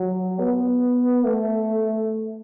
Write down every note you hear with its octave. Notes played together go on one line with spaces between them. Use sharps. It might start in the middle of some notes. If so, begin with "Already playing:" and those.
Already playing: F#3
B3
A3